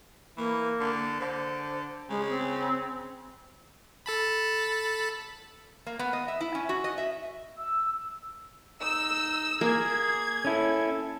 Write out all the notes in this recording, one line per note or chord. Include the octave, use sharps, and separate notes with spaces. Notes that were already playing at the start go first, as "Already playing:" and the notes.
E3 A#3
D3
D3 C5
C#3 G#3
C4
A4 A5 B5
A#3
B3
D#5
E5
E4
C#4
F#4
D#5
E5
E6
D#4 E6
A#3 G#4 G#6
C#4 E4 A4